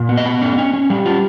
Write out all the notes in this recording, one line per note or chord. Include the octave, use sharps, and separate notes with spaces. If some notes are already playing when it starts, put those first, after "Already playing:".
Already playing: A#2
B3
D#5
B3
C#4
C#4
C#4
G3
F4